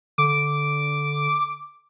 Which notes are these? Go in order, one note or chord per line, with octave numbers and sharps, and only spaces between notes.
D3 D6